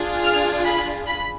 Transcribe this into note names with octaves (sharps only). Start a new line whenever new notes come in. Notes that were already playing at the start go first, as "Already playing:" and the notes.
Already playing: D4 F4 G#4
F6
B5
B5